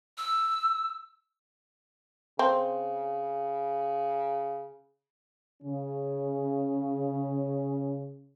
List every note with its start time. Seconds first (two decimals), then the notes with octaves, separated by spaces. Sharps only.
0.18 E6
2.39 C#3 C4
5.62 C#3 C#4